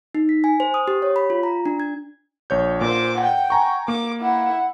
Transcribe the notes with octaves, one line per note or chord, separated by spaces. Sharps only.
D#4
B6
G#5
C5
D#6
G4
C#5
B5
F4
A#5
D4
G#6
A#1 C#5 G6
A#2 C5 D6
F#5 G5
G#5 A#5 C#6
A#3 D6
E4 F#5